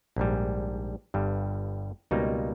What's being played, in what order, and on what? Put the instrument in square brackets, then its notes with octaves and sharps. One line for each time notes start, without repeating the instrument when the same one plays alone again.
[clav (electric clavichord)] A#1 G#2 G3
G1 G2 G3
C#2 B2 G3 A#3 D#4